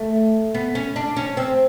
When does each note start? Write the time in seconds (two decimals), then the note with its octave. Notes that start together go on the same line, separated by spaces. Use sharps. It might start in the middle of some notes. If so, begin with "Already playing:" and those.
Already playing: A3
0.55 B3
0.75 C#4
0.96 D4
1.17 C#4
1.37 C4